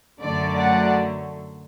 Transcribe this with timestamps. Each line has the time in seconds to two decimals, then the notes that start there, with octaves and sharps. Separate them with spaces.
0.21 F#2 D3 F#3 A3 D5
0.55 D5 F#5